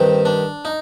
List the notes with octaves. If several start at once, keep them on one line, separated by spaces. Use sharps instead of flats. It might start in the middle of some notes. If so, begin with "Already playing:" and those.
Already playing: G2 D#3 C4
D4
D#4